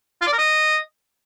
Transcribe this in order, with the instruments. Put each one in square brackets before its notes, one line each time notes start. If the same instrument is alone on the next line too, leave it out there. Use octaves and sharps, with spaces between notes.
[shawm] F4
D5
A#4
D#5